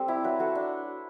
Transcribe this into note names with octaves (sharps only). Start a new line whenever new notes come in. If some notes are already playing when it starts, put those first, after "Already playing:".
Already playing: G3 C4 A4
E4 G4
F#3 B4
F#3 A4
D4